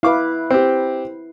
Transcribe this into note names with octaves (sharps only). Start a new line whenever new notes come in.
E4 B4 F5 D6
C4 G4